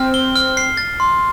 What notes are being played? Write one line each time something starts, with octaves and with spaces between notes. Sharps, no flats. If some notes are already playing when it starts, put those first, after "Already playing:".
Already playing: C4 F6
G7
F6
C7
A6
C6